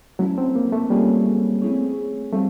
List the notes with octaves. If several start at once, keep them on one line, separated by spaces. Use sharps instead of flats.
F#3 A3 C#4 E4 A4
C4
A#3
A3
G3 A#3 C#4 F4 G#4 C#5
A3 C4 E4 G#4 C#5
G3 A3 C4 F4